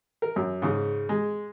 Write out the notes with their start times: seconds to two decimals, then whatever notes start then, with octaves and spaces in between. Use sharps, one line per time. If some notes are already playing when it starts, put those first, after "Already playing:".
0.22 A#4
0.36 F#2
0.62 G#2 C#3
1.09 G#3